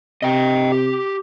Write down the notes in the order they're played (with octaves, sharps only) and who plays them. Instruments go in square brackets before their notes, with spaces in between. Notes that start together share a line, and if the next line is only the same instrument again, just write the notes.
[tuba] C3 [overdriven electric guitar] D#5 G5
[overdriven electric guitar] G4